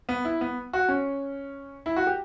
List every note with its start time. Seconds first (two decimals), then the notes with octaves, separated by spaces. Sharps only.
0.09 B3
0.25 E4
0.41 B3
0.73 F#4
0.89 C#4
1.86 E4
1.96 F#4
2.07 G4